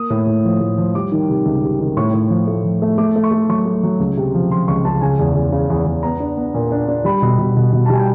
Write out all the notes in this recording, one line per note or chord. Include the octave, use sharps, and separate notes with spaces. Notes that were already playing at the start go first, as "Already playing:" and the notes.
Already playing: A#3 D#6
A2
A2
F3
A2
F3
G3 D6
D#3
C3
C#2
C3
D#3
A2 C#6
A2
F3
A3
F3
A3
A3 D6
A3
C#6
A3
F#3 C#6
A3
F#3
C#2
C3
F3
F3 C6
C#2 C#6
C#2 A5
C#3 G#5
E2
E2
C#3
E2
E2
B3 A#5
D4
B3
A#2
D4
D4
G3 B5
B2
B2
B2
B2
A5
G3 G#5
G5